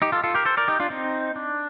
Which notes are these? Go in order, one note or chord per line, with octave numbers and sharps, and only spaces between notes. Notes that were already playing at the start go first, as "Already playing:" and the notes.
D#4 G4
F4 A4
F4 A4
G4 A#4
A4 C5
A#4 D5
D#4 G4
D4 F4
C4 D#4
D4